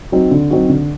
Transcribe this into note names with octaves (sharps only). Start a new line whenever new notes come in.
F#3 C4 D#4 F#4
D3
F#3 C4 D#4 F#4
D3